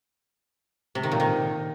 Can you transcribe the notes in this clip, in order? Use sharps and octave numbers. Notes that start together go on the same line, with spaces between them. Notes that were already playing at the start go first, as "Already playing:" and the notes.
C3
D#3
A#2
D#3